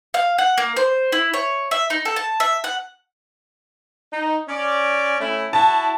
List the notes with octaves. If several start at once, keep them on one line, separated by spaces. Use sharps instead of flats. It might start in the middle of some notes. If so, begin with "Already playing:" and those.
F5
F#5
A#3
C5
E4
C#5
E5
D#4
A4
A5
E5
F#5
D#4
C#4 D5
A3 C#4 E4
E4 F#4 A5